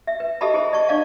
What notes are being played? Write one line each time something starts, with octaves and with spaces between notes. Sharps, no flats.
E5
B4
G4 A4 D#5 E5 A5 B5
E4 G#4 C5
D5 D#5 A5 C#6
D4 D5 F5 A5